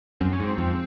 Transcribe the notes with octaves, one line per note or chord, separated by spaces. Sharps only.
F#2 C4
C#4
G#2 C4
F2